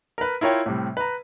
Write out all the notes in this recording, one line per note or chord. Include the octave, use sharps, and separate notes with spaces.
A#4 B4
E4 F4 A#4 C#5 G5
A2 C3 G3
B4 A#5